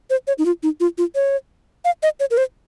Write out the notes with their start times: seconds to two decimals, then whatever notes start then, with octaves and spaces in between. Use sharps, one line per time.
0.10 C5
0.27 C#5
0.38 D#4
0.46 F4
0.63 D#4
0.80 F4
0.98 F4
1.15 C#5
1.85 F5
2.03 D#5
2.20 C#5
2.31 A#4
2.37 C5